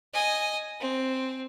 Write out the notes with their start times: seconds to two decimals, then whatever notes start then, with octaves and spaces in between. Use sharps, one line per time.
0.14 D#5 G#5
0.80 C4